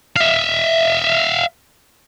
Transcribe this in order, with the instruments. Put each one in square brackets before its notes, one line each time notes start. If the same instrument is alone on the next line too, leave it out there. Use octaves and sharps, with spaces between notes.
[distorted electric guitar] E5 F5